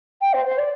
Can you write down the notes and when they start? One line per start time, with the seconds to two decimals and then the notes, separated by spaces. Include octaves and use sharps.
0.22 G5
0.34 C5
0.46 C5
0.58 D5